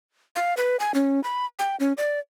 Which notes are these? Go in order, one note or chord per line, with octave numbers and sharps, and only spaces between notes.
F5
B4
G#5
C#4
B5
G5
C#4
D5